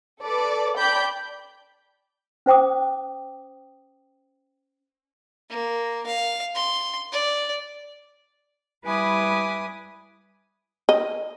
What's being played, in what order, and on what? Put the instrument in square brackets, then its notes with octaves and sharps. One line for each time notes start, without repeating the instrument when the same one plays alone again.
[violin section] A4 B4 D5
D5 G5 A5 B5 G6
[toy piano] C#4 C5 G5 D6 D#6
[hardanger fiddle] A#3
F5
C6
D5
[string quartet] G3 E4 B4 G#5 D6 D#6
[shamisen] D#5